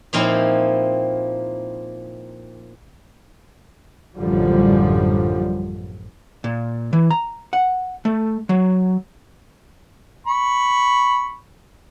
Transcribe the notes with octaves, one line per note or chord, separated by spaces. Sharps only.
A#2 F3 C4 D#4 E4
A1 F#2 A2 D3 F3 G3
A#2
E3
A#5
F#5
A3
F#3
B5 C#6